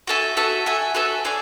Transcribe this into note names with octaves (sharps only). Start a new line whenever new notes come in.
F#4 A4 E5 G#5
F#4 A4 E5 G#5
F#4 A4 E5 G#5
F#4 A4 E5 G#5
C#4 G#4 D5